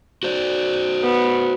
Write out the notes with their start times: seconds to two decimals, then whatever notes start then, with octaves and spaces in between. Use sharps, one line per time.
0.23 F#4 C5 D5
1.03 B3